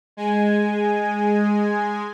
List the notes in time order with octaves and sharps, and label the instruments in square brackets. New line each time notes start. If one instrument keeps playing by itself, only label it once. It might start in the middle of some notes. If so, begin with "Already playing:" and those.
[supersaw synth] G#3 G#5